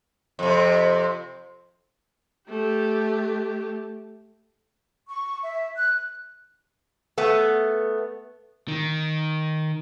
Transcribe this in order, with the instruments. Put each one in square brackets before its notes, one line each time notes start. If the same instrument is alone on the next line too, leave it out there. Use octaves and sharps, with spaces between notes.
[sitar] F2 C3
[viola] A3 G4
[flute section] C#6
E5
F#6
[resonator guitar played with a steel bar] A3 B3
[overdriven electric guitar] D#3